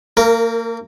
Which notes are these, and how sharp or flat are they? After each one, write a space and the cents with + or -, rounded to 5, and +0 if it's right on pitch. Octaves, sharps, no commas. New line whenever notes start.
A#3 -30 A#4 +0